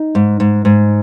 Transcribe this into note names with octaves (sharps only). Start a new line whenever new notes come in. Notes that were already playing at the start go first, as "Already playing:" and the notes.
Already playing: D#4
G#2
G#2
G#2